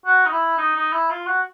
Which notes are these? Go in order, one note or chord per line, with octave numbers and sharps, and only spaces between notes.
F#4
D#4
E4
D#4
D#4
E4
F4
F#4